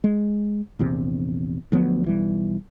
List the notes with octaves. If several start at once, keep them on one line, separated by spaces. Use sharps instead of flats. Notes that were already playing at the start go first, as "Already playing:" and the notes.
G#3
A#1 E2 C3
D2 F3 F#3 B3
B1 E3 G3